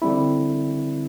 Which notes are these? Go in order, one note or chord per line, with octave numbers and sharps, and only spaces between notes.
D3 G3 C4 E4